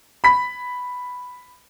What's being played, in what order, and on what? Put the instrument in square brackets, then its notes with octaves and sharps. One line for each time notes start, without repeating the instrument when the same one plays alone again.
[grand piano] B5 B6